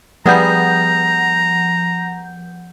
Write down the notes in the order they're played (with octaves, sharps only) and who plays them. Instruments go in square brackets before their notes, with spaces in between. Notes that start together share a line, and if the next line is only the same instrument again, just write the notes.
[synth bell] F3 F#5 G6 [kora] G3 B3 G#4 [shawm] A#5